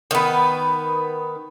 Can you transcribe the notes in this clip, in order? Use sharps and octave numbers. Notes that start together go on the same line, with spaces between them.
D#3 B3